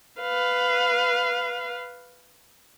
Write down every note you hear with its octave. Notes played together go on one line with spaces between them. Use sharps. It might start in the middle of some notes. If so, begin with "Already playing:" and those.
B4 F5